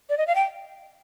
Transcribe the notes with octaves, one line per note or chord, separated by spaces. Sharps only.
D5
D#5
F5
G5